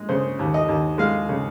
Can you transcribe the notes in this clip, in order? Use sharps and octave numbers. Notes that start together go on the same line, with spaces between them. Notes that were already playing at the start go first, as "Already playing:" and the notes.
Already playing: G#3
C#3 C5
D#2
D#5
D#2
G#3 F5
C#3